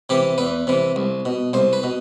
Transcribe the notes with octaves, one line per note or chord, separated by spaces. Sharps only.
C3 E3 G4
E2 B4
C3 E3
C2
B2
C2 C5
B4
B2